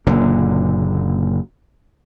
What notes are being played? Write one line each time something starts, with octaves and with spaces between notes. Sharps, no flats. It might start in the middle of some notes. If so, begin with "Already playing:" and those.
F#1 A#2 D3